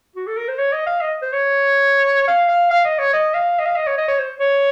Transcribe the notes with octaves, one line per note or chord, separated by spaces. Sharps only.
F#4
A4
A#4
C5
C#5
D#5
F5
D#5
C5
C#5
F5
F5
F5
D#5
C#5
D#5
F5
D#5
F5
D#5
C#5
D#5
C#5
C5
C#5